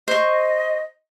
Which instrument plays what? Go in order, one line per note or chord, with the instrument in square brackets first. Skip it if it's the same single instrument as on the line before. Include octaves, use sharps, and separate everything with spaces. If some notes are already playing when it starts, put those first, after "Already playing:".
[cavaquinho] C5 C#6 [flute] D#5